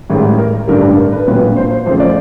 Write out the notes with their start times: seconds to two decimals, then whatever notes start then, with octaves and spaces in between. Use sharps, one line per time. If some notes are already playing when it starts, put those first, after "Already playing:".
0.10 A1 G#2 D#3 G3
0.38 A#4
0.67 A1 G2 D3 G3 A#4
0.82 A4
0.97 A#4
1.12 B4
1.27 A#1 A#2 F#3 B4
1.56 C5
1.71 C5
1.86 F#1 F2 C#3 F3 A3 C5
2.00 D5